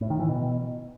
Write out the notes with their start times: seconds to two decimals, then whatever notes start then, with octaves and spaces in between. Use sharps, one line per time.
0.01 A2
0.10 D#3
0.19 E3
0.29 B2